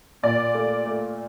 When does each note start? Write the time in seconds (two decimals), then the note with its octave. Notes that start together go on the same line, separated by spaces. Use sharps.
0.23 A#2 D5
0.54 A3
0.86 A3